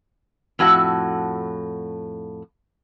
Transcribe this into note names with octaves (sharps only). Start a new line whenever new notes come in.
F2 A2 F#4 E5 F#5